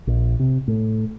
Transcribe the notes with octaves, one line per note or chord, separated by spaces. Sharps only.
A#1
C3
A2